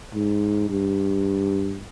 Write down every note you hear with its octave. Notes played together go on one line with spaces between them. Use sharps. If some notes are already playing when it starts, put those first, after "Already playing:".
G#2
G2